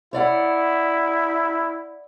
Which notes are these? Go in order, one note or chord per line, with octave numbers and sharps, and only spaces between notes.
E4 C#5 D5 F#5